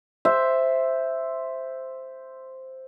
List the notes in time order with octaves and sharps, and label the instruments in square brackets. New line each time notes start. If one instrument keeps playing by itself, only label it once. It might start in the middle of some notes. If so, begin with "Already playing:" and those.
[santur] C5 [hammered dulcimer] E5